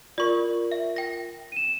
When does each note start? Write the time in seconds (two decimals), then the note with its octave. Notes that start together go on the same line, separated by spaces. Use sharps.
0.18 F4 A#4 D5 C#6
0.72 E5
0.96 G5 A#6
1.52 D#7 E7